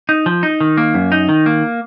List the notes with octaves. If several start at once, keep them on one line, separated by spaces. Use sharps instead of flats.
D#4
F3
D#4
D#3
A#3
F#2
D#4
D#3
A#3